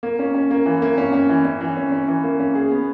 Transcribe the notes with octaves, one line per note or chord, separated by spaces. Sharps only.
A#3
C#4
C#4
A#3
E3
A#3
C#4
C#4
E3
C#4
E3
C#4
C#4
E3
A#3
C#4
G#4
B3